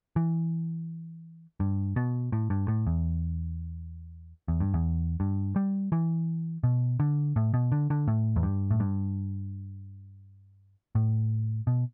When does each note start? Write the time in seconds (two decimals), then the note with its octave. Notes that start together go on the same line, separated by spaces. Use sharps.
0.16 E3
1.60 G2
1.96 B2
2.32 A2
2.50 G2
2.68 A2
2.87 E2
4.48 E2
4.60 G2
4.74 E2
5.20 G2
5.56 G3
5.92 E3
6.64 B2
7.00 D3
7.36 A2
7.54 B2
7.72 D3
7.90 D3
8.08 A2
8.36 E2
8.43 G2
8.71 A2
8.80 G2
10.95 A2
11.67 B2